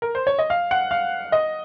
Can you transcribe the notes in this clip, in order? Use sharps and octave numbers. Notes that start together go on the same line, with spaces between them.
A#4
C5
C#5
D#5
F5
F#5
F5
D#5